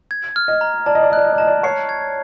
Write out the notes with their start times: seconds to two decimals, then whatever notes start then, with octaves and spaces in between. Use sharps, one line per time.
0.11 G#6
0.36 F6
0.48 D#5
0.61 A#5
0.86 D5 A5
0.95 D#5
1.03 D5
1.10 D#5
1.13 D5 F#6
1.24 D#5
1.33 D5
1.38 D#5 A5
1.47 D5
1.63 C#5 C7
1.89 G#6